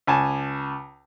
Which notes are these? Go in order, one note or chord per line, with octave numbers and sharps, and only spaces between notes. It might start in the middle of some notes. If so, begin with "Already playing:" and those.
C#2 G#5 A5